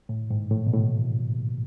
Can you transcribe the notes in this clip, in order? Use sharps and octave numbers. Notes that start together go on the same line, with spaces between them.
A2
G#2
A2
B2
A2